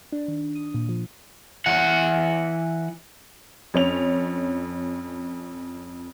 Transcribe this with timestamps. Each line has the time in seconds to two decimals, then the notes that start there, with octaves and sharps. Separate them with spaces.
0.12 D4
0.28 D#3
0.55 D#6
0.74 A#2
0.89 F3
1.66 E3 F#5
3.74 F2 C#4 F7